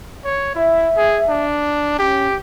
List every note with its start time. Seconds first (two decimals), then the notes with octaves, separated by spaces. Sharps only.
0.25 C#5
0.55 E4 E5
0.97 G#4
1.28 D4
1.99 C#4 G4